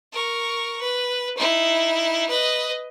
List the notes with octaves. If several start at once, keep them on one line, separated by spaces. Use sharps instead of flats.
A#4 C#6
B4
D#4 E4
B4 D#5